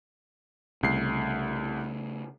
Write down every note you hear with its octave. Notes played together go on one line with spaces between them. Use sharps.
C2 C#3 A3 C7